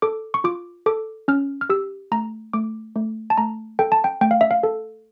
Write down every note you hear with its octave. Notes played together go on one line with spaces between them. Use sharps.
A4 D6
C#6
F4 D6
A4 D6
C#4 F6
F6
G4 E6
A3 A#5
A3 D6
A3
A5
A3 A#5
A4 G5
A5
G5
A3 G5
F5
E5
F5
A4